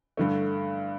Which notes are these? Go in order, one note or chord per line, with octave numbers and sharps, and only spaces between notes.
G2 D3 A3